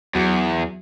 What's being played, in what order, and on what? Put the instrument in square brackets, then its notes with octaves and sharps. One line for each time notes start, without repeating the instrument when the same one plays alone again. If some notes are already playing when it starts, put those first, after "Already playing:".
[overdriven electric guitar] E2 [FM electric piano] F#3